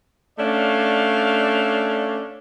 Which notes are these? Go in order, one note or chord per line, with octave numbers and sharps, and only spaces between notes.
A3 C#4 D4 D5 F5